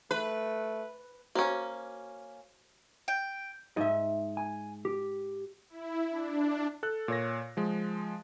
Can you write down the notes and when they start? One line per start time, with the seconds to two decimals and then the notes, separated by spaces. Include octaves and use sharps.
0.11 A3 B4
1.35 A#3 C#4 F#4 C5 A#5
3.08 G5
3.77 G#2 D#5 E5
4.37 G#5
4.85 G4
5.69 E4
6.10 D4
6.83 A4 F#6
7.08 A#2 C#5 A#6
7.57 F3 G#3